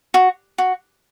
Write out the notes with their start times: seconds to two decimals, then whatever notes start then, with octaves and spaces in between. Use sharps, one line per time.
0.14 F#4
0.58 F#4